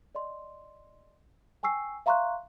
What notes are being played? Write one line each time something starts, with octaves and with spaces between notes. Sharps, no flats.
D5 D#5 C6
G5 G#5 C#6 E6 C7
E5 F5 A#5 C6 C#6 F#6